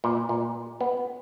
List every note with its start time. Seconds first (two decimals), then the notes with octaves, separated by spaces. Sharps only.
0.04 A#2
0.29 A#2
0.81 B3